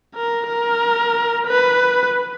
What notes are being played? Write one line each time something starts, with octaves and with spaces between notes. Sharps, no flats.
A#4
A#4
B4